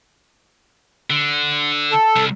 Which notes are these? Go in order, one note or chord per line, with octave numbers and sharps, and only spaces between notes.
D3
A4
C2